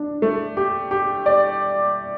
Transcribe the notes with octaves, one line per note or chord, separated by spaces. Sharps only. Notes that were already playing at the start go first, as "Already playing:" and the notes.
Already playing: D4
A3
G4
G4
D5